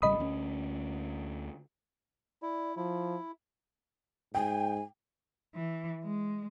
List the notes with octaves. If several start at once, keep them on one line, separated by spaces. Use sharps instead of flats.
G#1 C#3 G3 D#5 B5 D#6
D2 A#3 C#4
E4 D5
F3 E4
G#2 G5 G#5
E3
G#3